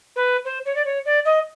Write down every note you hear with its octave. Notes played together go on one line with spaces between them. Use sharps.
B4
C5
C#5
D5
C#5
D5
D#5